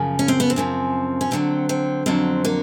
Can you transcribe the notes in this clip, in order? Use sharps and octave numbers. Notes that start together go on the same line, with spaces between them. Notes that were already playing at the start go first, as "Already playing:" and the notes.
Already playing: F#2 C#3 F3
C#4
C4
B3
C4
F#2 C#3 F3
C#4
F2 D3 F#3 C4
C4
F2 D3 F#3 C4
A#3